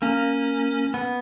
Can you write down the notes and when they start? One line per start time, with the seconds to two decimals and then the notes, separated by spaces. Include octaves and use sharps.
0.02 A#3 C#4
0.94 B3